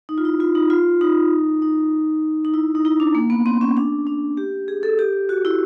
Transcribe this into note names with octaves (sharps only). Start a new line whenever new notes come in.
D#4
F4
E4
F4
D#4
F4
D#4
D#4
D#4
E4
D#4
E4
D4
A#3
B3
C4
C#4
D4
D4
G4
G#4
A4
G4
F#4
E4